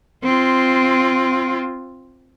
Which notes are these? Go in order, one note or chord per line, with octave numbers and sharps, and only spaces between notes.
C4 F4